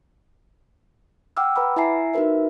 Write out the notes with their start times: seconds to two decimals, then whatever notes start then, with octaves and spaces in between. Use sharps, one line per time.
1.37 F#5 G5 D6 E6 F6
1.56 B4 F#5 A#5 B5 D6
1.76 E4 E5 G#5 A#5 C7
2.13 D#4 F#4 A#4 B4 E5